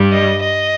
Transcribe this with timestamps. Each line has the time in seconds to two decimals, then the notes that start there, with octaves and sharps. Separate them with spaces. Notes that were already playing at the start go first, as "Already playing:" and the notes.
Already playing: G2 G3
0.12 D#5
0.43 D#5